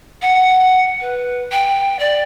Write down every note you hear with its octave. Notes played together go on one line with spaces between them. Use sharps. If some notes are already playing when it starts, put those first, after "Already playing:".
F#5
B4
G5
D5